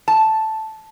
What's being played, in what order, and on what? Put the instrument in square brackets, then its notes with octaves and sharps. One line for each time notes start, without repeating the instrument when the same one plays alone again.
[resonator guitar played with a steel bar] A5